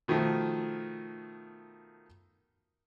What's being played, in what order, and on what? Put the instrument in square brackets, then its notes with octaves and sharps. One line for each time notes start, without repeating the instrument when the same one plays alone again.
[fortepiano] B2 D#3 F3 A3